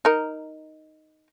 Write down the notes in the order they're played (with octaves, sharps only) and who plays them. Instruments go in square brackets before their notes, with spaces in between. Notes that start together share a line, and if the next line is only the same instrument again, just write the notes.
[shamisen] D#4 A#4